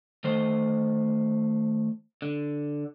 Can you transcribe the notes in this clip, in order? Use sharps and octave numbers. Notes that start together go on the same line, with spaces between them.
D#3 A3 C5
D3